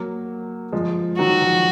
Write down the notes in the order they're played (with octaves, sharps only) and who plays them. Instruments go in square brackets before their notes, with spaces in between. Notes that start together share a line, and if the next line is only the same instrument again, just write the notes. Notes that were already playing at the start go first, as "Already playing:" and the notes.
Already playing: [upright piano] F#3 A#3
F3 G#3
[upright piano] D#3 F#3 [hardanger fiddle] F#4
[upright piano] F3